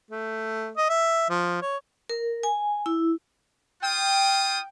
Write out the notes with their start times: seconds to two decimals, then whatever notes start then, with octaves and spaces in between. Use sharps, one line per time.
0.11 A3
0.77 D#5
0.89 E5
1.30 F3
1.62 C#5
2.09 A#4
2.43 G#5
2.86 E4
3.82 F4 F5 G5 D#6